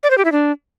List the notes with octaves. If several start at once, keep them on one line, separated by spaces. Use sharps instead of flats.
D5
C5
G4
E4
D4